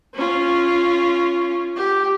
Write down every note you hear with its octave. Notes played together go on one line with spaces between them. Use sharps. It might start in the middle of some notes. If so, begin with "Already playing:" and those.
C#4 F4
G4